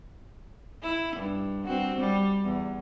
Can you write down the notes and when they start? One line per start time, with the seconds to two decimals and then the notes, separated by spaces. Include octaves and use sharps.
0.83 E4
1.16 G2
1.65 C4 F#4
2.00 G3
2.43 E2